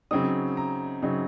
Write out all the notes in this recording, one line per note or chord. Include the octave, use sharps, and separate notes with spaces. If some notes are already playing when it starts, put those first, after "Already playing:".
C#3 F#3 C4 D#4 D#6
A#5
C#3 F#3 C4 D#4